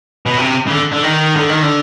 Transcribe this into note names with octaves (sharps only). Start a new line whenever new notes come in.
B2
C3
C#3
D3
D3
D#3
D3
D#3
D3